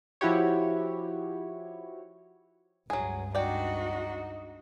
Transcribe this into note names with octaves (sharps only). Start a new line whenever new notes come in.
F3 E4 F#4 G4 C#5
C#2 G2 F#3 G#4
D4 D#4 F#4 D5 G5